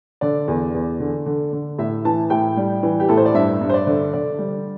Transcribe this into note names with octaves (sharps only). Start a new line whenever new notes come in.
D3 D5
E2
E2
D3
D3
D3
A2 E5
E3 A5
A2 G5
G3
E3
G4
A2 A4
C5
D5
G2 E5
G2
C5
D5
D3
D3 D5
G3